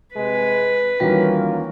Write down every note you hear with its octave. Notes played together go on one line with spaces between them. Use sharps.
C3 G#3 B4
D#2 E3 F#3 G3 A#3 C#4 F4